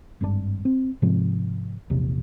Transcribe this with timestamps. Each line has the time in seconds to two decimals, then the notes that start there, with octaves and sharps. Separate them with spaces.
0.21 G#1 G2 C3 D4
0.65 C4
1.02 G#2 C3 F3
1.90 A#1 E2 C3